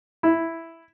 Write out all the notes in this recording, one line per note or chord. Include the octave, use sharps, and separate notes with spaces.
E4